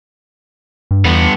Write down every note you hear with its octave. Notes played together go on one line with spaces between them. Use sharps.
G2
E2 G2 B3